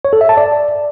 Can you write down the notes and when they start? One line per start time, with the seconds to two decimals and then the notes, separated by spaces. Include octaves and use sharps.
0.05 C#5
0.13 A4
0.21 E5
0.29 A5
0.37 D5